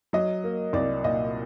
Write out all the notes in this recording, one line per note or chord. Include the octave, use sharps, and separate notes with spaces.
F#3 D#5
A#3
C2 D5
A#2 D#5